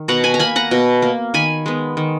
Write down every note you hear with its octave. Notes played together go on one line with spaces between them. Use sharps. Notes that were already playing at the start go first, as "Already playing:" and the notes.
Already playing: D#3
B2 F#5 A#5
G#5 B5
A#5
A#3 G#5 B5
F#5 A#5
B2
A#3
D#3 G#5 B5
G#3 B3
D#3